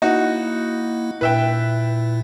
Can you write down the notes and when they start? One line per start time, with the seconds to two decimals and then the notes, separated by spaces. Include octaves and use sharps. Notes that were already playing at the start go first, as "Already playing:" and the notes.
0.02 A#3 D#4 E4 F#4
1.21 A#2 E4 B4 E5 G5